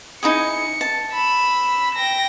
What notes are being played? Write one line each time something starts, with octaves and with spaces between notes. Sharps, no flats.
D#4 E4 G#4 C#7
A5
B5 E6
G5 A#6